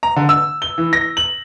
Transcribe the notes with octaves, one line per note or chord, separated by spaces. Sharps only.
A#5
D3
E6
G7
E3
A#6
F#7